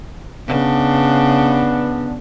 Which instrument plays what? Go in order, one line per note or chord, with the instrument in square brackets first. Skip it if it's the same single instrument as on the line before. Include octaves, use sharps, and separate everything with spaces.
[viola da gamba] C#3 [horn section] B3 D4